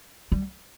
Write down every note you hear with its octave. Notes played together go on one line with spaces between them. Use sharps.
G3